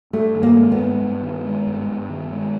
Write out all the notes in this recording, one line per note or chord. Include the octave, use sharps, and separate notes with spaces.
G2 A3
D#3
A#3
G#3
B3
G2
G2
D#3
G#3
G2
G2
D#3
G#3